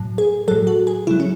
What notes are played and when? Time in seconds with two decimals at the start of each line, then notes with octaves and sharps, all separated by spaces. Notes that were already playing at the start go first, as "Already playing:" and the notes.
Already playing: A2 F#3
0.18 G#4
0.48 A2 F#3 A4
0.67 F#4
0.87 G#4
1.07 C#3 F#3 E4
1.20 C#4